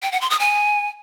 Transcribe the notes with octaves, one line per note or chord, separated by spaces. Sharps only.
G5
F#5
C6
D#6
G#5